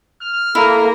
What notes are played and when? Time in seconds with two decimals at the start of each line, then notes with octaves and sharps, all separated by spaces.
0.22 F6
0.55 A#3 E4 A4 A#5